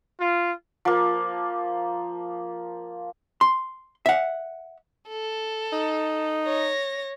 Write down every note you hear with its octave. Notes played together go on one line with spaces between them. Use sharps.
F4
F3 A#3
C6
E5 F#5
A4
D#4
C#5 A#6